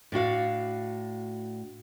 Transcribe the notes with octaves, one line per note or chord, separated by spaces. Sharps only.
A2 D4 F#4 F5